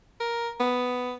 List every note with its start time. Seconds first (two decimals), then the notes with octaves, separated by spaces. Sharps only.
0.20 A#4
0.60 B3